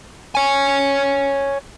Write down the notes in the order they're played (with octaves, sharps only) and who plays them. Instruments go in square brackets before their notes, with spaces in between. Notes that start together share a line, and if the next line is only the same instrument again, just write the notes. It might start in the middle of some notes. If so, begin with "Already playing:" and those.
[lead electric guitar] C#5 G#5